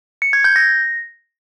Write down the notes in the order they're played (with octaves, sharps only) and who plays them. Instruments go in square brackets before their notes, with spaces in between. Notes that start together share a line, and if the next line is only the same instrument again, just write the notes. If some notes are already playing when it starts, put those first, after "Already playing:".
[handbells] C#7
G#6
G6
A#6